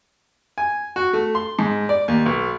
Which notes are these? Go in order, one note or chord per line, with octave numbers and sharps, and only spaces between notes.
G#5
F#4
A3
C6
G#2
D5
D#2
B1